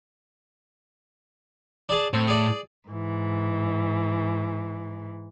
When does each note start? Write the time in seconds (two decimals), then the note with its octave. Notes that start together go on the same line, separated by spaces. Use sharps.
1.89 D4 G#4 A5
2.13 A2 C4
2.27 G#4 D5
2.90 G#2 E3